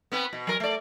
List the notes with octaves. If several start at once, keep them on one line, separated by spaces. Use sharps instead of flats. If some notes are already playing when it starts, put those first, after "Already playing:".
B3 C4 B4
B2
F#3 A#4
A3 D5